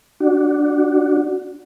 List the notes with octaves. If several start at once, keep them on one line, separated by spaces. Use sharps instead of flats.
D4 F#4